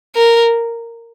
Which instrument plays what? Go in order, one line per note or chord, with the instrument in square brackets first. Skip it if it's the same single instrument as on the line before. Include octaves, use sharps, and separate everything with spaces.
[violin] A#4